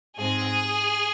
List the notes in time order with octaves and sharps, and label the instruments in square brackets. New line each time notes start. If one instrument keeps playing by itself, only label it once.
[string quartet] G#2 G#3 C4 G#4